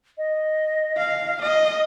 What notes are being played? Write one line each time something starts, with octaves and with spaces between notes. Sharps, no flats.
D#5
F5
D#5